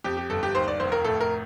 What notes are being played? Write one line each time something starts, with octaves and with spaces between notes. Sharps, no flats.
F2 G4
G4
G1 A4
G4
D#2 C5
D5
F1 C5
A#4
A2 A4
A#4